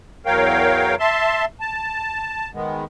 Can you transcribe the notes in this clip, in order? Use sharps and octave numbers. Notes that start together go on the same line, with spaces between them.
E2 F#3 A#4 C#5 F5 G5
E5 A5 C6
A5
D#3 G#3 B3